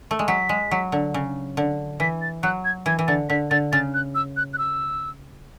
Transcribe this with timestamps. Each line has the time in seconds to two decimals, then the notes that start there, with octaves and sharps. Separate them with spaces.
0.11 A3
0.19 G#3
0.28 F#3 B6
0.49 G#3
0.71 F#3
0.92 D3
1.14 C#3
1.57 D3
2.00 E3 B6
2.22 A6
2.43 F#3 F#6
2.65 G#6
2.86 E3 G#6
2.99 E3
3.07 D3 A6
3.29 D3 B6
3.51 D3 A6
3.72 C#3 A6
3.94 F#6
4.15 E6
4.37 F#6
4.53 F#6
4.58 E6